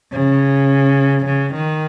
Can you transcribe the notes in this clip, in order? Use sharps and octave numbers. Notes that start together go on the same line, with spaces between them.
C#3
C#3
D#3